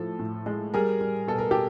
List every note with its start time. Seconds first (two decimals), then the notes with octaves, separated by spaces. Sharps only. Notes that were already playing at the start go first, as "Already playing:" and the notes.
Already playing: A2 F3 A4
0.19 A2
0.46 G#3
0.74 G3 G#4 A#4
1.01 G3
1.27 B2 A4
1.39 A#4
1.51 G4 A4